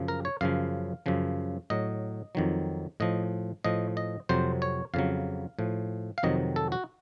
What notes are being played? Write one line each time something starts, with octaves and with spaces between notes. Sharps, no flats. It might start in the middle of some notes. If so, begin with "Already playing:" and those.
Already playing: F#2 C#3 F3
A#4
C#5
F#2 C#3 F3 F5
F#2 C#3 F3
A2 F#3 D#5
F2 D#3 F#3
A2 F3 D#5
A2 F3 D#5
D#5
F2 C3 F#3 C5
C#5
F2 C#3 F#3 F5
A2 F3
F5
F2 C3 D#3 F#3 D#5
A4
F#4